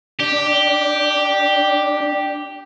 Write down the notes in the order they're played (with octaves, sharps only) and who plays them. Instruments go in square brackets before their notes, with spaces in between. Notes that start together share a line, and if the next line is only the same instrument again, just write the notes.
[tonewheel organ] D4 [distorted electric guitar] G4